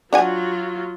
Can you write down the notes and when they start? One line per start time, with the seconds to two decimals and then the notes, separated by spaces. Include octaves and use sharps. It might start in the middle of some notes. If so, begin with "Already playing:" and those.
0.13 F#3 D4 F4 F#5 G#5